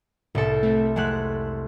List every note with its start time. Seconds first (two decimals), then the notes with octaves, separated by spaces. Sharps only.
0.35 C2 A2 A4
0.63 A3 C4
0.96 F2 G#3 A3 F#5 F#6